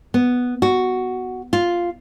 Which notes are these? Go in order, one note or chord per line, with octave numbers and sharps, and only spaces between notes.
B3
F#4
F4